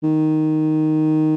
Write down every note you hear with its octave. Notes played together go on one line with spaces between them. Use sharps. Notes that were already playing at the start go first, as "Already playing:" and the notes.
D#3